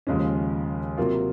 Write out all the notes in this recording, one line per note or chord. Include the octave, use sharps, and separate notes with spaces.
D#2 C#3 F3 G#3 C#4
C3 F#3 A#3 F4